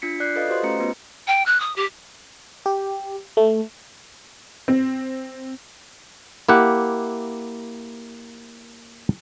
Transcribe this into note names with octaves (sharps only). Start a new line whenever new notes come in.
D4 F4 B6 C#7
D5 F#6 G6 C7
F4 A4 B4 D#5 F5
F#4 G4 B4 C5 D#5 C6
A3 C#4 A#5 C#7
B3 F4 B4
G5
F#6
D#6
G4
G4
A3
C4
A#3 E4 G4 F#5